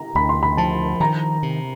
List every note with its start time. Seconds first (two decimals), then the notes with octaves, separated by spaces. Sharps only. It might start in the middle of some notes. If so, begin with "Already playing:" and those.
Already playing: A#5
0.15 D2 B5
0.29 C6
0.43 B5
0.57 F3 A5
1.00 D#3 A#5
1.43 C3